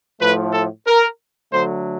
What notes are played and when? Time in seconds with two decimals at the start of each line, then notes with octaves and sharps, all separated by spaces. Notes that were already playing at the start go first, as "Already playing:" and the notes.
0.21 A2 F3 A3 B4
0.53 A4
0.87 A#4
1.52 D3 F#3 A3 C5